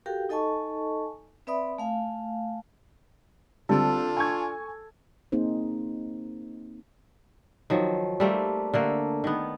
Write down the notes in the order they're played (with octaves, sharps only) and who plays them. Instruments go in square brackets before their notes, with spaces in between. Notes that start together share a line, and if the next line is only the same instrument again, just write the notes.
[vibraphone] F#4 G4 A4 A#4 F5 G5
D#4 A4 D#5 G#5 A5 C#6
C4 B4 D5 E5 B5 D#6
A3 F5 G#5
[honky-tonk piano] D3 G3 C4 [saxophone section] D4 F4 [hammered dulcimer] A4
[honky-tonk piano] G#5 C#6 G#6
[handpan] A#3 C4 D#4 G#4 C5
[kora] D#3 F3 F#3
G3 A3 A#3 C4
D3 A3 A#3
D#3 B3